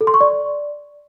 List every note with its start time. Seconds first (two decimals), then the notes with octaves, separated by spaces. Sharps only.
0.01 A4
0.07 C6
0.14 C#6
0.21 D5